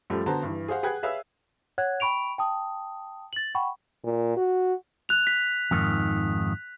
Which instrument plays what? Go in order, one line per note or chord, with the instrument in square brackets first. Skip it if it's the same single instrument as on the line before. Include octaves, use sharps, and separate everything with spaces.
[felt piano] F#2 F3 G3 A3
D3 B3 F#4 C5 A5 A#5
G2 E3
G#4 C5 F5 F#5
G#4 B4 F#5 G5 F#6 G#6
G#4 B4 C#5 E5 F5 E6
[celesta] C#5 F#5 F#6 G#6
G5 B5 C#6 D7 F7
G5 A5 D#6
A6 F#7
F#5 G5 B5 C#6
[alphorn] A#2
F#4
[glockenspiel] F#6 F7
B6
[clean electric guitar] F2 G#2 D#3